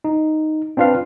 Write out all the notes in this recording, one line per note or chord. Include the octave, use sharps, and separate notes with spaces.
D#4
C4 D4 F4 B4 F5